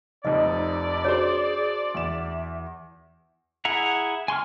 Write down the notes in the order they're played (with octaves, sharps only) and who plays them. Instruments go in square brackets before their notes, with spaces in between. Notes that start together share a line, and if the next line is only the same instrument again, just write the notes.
[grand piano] F1 F2 [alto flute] D#4 [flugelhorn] D5 [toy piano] D#5
[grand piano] D4 C5 [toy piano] F#4 C#5 [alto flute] G#4
[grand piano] E2 E7 [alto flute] E5
[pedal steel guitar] E4 G#4 F#5 A#5
G#5 C6 C#6 F6